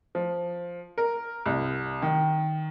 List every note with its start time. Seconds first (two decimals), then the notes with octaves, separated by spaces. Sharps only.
0.15 F3
0.98 A#4
1.46 C2
2.02 D#3